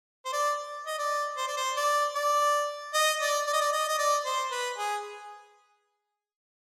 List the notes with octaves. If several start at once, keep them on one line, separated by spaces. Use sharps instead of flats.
C5
D5
D#5
D5
C5
D5
C5
D5
D5
D#5
D5
D5
D#5
D5
D#5
D#5
D5
C5
B4
G#4